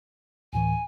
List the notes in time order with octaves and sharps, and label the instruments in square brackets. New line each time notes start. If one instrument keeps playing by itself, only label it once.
[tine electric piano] D2 A2 E3 [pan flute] G#5